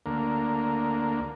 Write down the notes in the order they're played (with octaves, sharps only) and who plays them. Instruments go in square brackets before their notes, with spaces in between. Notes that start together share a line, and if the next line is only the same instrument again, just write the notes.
[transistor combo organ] D2 A#3